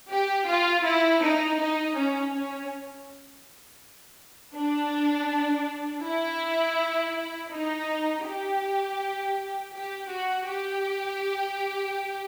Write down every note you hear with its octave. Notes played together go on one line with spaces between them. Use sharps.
G4
F4
E4
D#4
D#4
C#4
C#4
D4
E4
D#4
G4
G4
F#4
G4